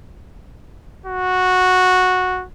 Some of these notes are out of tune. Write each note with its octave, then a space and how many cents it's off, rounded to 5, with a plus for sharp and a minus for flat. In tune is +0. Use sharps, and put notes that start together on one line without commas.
F#4 -10